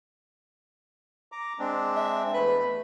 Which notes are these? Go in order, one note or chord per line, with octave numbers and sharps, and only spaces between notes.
A#5 D6
G#3 C4 D4
E5
E2 A3 B4